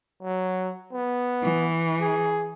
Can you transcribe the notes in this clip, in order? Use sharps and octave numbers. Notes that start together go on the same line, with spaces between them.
F#3
B3
E3
G#4